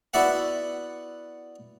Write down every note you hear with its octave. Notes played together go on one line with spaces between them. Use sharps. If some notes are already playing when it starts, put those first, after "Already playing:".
B3 E4 F#4 D5 E5 F#5